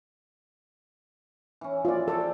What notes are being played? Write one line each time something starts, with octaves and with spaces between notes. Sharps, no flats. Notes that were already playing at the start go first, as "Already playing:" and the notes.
E3 C#4
F4 D5
A4 C5 D5 G5